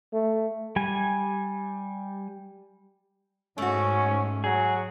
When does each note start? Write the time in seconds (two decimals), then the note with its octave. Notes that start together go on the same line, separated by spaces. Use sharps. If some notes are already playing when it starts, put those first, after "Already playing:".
0.13 A3
0.76 G3 G#5
3.58 G#2 A3 C#4 F#4
4.44 F#3 G#4